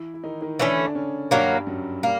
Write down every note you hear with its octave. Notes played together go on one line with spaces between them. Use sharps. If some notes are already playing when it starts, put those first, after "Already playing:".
Already playing: E3 E4
E4
D#3 D#4
D#3 D#4
D3 E3 A3 C#4 D4
D4
C#3 C#4
G2 D#3 F#3 G3 A#3
F#2 F#3
G3 A#3